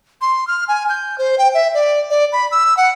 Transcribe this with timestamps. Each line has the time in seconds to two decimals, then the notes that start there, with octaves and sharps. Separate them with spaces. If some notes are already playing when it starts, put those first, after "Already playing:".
0.21 C6
0.47 F6
0.68 G#5
0.89 G6
1.18 C5
1.38 G5
1.54 E5
1.74 D5
2.10 D5
2.33 B5
2.51 E6
2.77 F#5